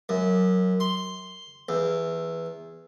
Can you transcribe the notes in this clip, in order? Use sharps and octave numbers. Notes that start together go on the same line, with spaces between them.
F#2
C6
E2